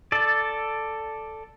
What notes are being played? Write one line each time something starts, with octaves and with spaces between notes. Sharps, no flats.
A4 D5